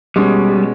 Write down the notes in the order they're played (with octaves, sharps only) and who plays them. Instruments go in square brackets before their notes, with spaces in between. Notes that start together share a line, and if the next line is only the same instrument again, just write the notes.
[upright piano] B2 G#3 C#4 [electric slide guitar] G3